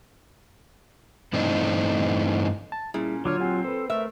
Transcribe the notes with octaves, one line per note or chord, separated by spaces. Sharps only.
G2 E3 A3 C4 D4 D#4
A5
A#2 G3 C#4 E4 G#4
D3 F#3 D4 F4 C#5 D6 F6
C4 G4 F#5 G#5
A4 B4 C5
A3 A#4 E5